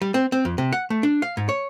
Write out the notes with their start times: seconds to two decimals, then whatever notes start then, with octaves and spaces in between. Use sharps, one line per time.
0.01 G3
0.14 C4
0.32 C4
0.45 F2
0.58 C3
0.73 F#5
0.90 A3
1.03 D4
1.22 F5
1.37 G#2
1.49 C#5